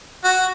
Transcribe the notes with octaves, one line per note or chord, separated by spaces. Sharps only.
F#4